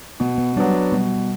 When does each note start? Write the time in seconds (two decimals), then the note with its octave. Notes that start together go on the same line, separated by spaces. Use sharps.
0.20 B2 B3
0.38 B3
0.56 F#3 G3 B3 D4
0.92 B2 G3